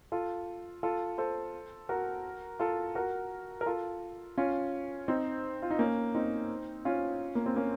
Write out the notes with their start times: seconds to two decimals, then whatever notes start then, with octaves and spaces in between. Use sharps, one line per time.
0.12 F4 A4
0.83 F4 A4
1.18 A4 C5
1.89 F#4 A#4
2.60 F4 A4
2.95 F#4 A#4
3.61 A#4
3.66 F4 A4
4.38 C#4 F4
5.08 C4 D#4
5.62 F4
5.71 D#4
5.79 A#3 C#4
6.15 C4 D#4
6.85 C#4 F4
7.35 A#3
7.46 C4
7.56 A#3 C#4